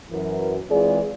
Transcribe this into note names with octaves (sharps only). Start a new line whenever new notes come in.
F#2 E3 A#4
E3 G#3 C4 F4 G#4 D5